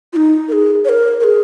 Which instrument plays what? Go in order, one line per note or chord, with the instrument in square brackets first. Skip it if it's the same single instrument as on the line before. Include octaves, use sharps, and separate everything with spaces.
[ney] F4
D#4
A#4
G#4
C#5
A#4
A#4
G#4